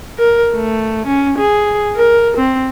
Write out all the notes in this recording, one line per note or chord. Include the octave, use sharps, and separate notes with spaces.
A#4
A3
C#4
G#4
A#4
C4